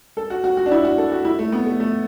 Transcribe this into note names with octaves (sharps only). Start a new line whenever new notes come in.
A4
F#4
F#4
F#4
D4
E4
F#4
A4
F#4
E4
A3
B3
A3
A3